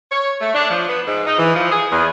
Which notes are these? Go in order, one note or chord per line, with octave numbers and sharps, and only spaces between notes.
C#5
A3
D4
F3
B3
G#2
D#4
E3
F3
G#4
E2